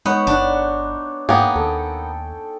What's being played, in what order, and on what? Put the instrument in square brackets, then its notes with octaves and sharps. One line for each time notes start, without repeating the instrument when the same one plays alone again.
[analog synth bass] G#3 [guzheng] B3 [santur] D#4 B4 C#5
[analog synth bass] G1 [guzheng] D4
[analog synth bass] G#2 [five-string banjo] A#3 B3 [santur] G#4 G5 A#5
[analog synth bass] D#2 [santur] A4